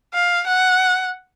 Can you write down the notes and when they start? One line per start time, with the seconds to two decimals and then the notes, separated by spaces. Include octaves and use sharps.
0.14 F5
0.47 F#5